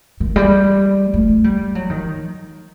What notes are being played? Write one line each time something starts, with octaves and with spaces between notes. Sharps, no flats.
D#3
G3
A3
G3
F#3
D#3